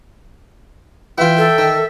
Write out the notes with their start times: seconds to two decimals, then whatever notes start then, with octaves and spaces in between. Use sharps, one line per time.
1.18 E3 F4 E5 G5
1.38 A4
1.58 D#3